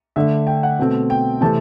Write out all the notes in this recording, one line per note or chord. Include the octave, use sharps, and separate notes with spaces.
D3 A3 D4 E5
G5
F#5
B2 A3 C4
G5
C3 E3 A3 C4 A5